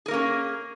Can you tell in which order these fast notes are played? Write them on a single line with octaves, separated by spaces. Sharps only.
G#4 A#4 A#3 C#4